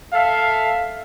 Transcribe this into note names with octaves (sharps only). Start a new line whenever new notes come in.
A4 E5 F5